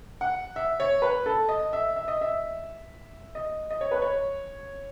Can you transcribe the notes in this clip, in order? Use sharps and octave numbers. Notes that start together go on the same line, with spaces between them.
F#5
E5
C#5
B4
A4
D#5
E5
E5
D#5
E5
D#5
D#5
C#5
B4
C#5